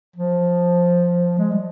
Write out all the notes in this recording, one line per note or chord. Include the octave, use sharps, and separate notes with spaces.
F3
G#3
G3